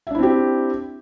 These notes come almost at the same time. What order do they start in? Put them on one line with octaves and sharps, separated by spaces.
E5 D4 E4 C4 G4